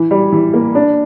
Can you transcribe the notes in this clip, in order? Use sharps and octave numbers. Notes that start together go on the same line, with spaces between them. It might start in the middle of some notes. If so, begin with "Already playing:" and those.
Already playing: E3
G3
E3
A#3
D4